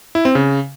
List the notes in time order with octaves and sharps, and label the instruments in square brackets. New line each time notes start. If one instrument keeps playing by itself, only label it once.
[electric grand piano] E4
C4
C#3